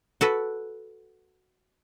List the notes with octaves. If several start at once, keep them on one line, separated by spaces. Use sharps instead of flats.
F#4 A4 B4